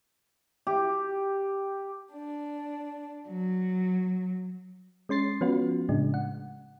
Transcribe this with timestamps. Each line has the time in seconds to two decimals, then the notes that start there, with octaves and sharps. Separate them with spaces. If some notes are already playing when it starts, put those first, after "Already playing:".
0.67 G4
2.14 D4
3.28 F#3
5.09 G#3 C#4 C6 A6 C7
5.41 F3 B3 C#4 F4 F#4 B4
5.89 A2 C#3 G#3 D4
6.14 F#5